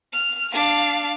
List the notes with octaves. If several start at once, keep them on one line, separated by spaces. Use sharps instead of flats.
F6
D4 F5